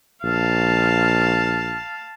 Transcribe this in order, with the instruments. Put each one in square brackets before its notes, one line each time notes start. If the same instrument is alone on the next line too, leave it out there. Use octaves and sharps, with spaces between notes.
[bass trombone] A#1 [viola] F5 A5